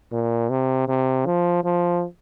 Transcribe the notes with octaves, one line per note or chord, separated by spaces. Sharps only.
A#2
C3
C3
F3
F3